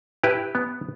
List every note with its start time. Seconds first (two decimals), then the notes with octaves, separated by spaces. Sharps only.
0.23 E4 G4 B4
0.55 B3